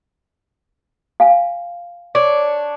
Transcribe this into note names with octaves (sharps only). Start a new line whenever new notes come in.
F5 G#5
D4 C#5